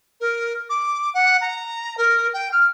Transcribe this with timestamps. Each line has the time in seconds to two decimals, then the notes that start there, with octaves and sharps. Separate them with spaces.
0.20 A#4
0.70 D6
1.14 F#5
1.41 A#5
1.98 A#4
2.34 G5
2.52 F6